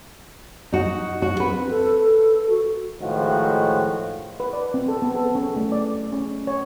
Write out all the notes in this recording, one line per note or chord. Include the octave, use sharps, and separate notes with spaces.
D#4 F#4
F#4
C4 B4
A4
F#4
A2 D#3 F3 G#3 F#4
B4
D5
C4
A4
B3
A4
C#4
A3
D5
C#4
C#5